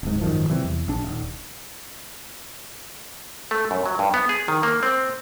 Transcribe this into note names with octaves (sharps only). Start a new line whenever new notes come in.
D1 G#2
G#1 F#2 D#3 F3
C3 E3 G3 C4
E2
A#1 D4
D#1
A3
F#2
F#3
G2
B3
G#4
D#3
A#3
C4